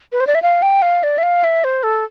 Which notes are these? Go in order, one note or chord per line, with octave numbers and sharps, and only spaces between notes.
B4
C5
D5
E5
F5
G5
F5
D5
E5
F5
E5
C5
A4